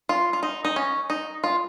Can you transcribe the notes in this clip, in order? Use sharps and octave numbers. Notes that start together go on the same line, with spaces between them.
F4
F4
D#4
D#4
C#4
D#4
F4